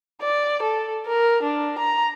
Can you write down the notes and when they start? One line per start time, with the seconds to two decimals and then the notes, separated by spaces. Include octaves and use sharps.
0.21 D5
0.62 A4
1.06 A#4
1.43 D4
1.78 A#5